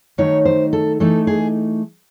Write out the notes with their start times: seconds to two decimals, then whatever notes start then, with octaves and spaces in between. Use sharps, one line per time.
0.18 D#3 F#3 A3 D#4 C#5
0.45 C5
0.73 A4
1.00 E3 A3 D#4 A4
1.27 G#4